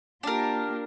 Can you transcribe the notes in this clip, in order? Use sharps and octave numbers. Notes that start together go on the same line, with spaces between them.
A#3 D4 F4 G4 A#4